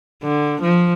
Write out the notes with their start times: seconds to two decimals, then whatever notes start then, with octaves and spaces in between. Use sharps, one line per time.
0.23 D3
0.62 F3